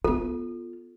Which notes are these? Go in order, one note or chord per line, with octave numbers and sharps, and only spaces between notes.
B3 F4 A4